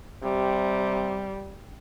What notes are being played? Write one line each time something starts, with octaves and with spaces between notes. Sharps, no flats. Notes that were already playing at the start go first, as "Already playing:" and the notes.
C3 G3